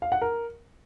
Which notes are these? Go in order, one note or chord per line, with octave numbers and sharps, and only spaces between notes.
F5
F#5
A#4